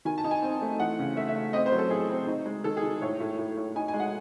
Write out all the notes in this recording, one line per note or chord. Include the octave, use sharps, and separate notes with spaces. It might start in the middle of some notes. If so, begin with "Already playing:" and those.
D#3 G#5
A5
D#4
G#5
C4
A3
E3 F#5
C#3
A3 E5
E5
A3
C4 D#5
C5
F#3
A4
A2 G#4
C4
D#4
G#3
D#3 A4
G#4
D#3
A2 C#5
A2
A2
A2
D#4 G#5
G#5
G#3
F#5